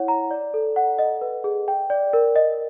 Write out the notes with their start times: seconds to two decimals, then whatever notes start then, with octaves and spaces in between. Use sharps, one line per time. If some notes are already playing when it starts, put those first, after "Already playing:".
Already playing: E4 C#5 F#5
0.08 A#5
0.31 D5
0.54 A4
0.76 F#5
0.99 D#5
1.21 B4
1.44 G#4
1.68 G5
1.90 D5
2.13 A#4
2.36 D#5